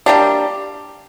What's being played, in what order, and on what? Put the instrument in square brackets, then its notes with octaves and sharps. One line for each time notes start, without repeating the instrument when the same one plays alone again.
[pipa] G3 A#3 D4 G4